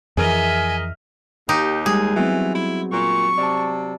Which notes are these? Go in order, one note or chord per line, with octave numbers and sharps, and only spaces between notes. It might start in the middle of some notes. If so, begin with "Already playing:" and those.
F2 E3 G#4 A#4 D#5 E5 G#5 F6
D#2 D#4 G4
G3 G#3 G#4
E3 F#3 B3 C4
E4
A#2 C#6
C3 D5 A5